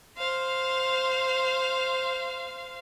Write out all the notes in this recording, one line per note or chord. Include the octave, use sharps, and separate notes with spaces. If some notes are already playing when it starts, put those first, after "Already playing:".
C5 F5